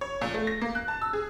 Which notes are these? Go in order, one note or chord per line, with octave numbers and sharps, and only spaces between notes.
C#5
A#2
A3
A#6
A#3
F#6
A5
E6
G#4